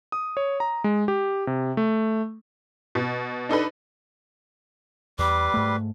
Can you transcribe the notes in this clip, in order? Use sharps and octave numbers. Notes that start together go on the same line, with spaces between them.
D#6
C#5
A#5
G#3
G4
C3
A3
B2
D4 D#4 A4 B4
E2 G3 B4 C6 D6
G#2 A3